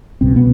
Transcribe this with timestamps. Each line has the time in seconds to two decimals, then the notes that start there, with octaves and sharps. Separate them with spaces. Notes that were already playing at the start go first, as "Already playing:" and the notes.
0.21 C2 B2 C4
0.36 B3